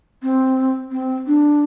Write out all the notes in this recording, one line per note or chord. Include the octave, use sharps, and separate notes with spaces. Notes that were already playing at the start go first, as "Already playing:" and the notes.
C4
C4
D4